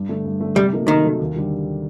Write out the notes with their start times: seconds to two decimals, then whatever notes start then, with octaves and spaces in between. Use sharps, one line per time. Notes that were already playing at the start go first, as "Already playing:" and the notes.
Already playing: G2
0.09 D3 A3
0.25 G2
0.40 D3 A3
0.56 C3 G3
0.73 F#3 A#3 D#4 A4
0.88 C3 D#3
1.04 F#3 A#3 D#4 A4
1.20 D#2
1.36 D3 G3